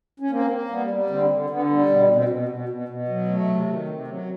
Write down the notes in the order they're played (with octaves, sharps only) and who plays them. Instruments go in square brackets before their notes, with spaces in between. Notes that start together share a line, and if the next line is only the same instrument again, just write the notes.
[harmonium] C#4
A#3 C4
A#3
G3 B3
G3
D3 C4
D3
D3 B3
G3
B2 B3
B2
C4
B2
B2
B2
B2
F#3
A3
C3
D#3
C3
F#3